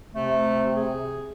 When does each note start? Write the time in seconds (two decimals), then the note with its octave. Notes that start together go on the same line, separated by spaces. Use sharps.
0.15 C3 A3
0.76 G#4